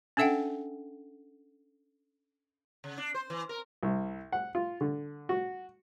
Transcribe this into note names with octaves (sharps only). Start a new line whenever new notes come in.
C#4 D4 A4 E5 F#5 G5
C#3
D4
C5
E3
A#4
C2
F#5
F4
D3
F#4